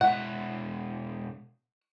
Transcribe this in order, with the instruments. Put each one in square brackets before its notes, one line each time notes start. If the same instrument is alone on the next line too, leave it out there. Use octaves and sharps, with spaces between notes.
[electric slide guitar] B2 G#3 E5 [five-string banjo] F#5